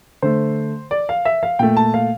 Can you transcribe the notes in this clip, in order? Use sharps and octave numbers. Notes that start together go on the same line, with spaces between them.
D3 A3 C5
D5
F5
E5
F5
A#2 A3 G5
A5
F5